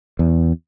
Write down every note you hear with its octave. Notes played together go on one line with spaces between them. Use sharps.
E2